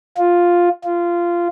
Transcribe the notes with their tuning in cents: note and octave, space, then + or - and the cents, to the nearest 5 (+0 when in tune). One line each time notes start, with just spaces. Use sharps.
F4 +5
F4 -15